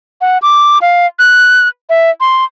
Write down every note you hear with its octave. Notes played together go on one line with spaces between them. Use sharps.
F#5
D6
F5
F#6
E5
C6